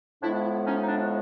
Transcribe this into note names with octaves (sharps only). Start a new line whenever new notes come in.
A2 F3 G#3 B3 D4 E4
C#4 D#4
D#4
D4